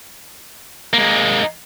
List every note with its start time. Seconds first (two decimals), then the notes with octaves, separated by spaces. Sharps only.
0.93 G#3 A#3